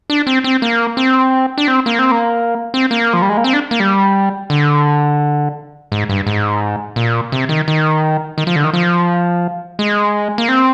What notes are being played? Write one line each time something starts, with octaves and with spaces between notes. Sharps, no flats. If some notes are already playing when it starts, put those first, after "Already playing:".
D4
C4
C4
A#3
C4
D4
C4
A#3
C4
A#3
C4
A#3
F3
G3
G#3
A#3
C4
D4
A#3
G3
D3
G#2
G2
G#2
A#2
C3
D#3
D#3
D#3
F3
D3
D#3
F3
G#3
A#3
C4